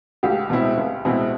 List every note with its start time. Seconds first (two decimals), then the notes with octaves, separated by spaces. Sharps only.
0.23 C#2 G4
0.50 B2 G#3 C4 E4
0.77 C#2
1.05 B2 G#3 C4 E4